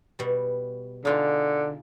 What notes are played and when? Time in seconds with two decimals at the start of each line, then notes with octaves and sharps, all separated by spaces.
0.19 B2 G3
1.05 D3 D#4 F4 G#4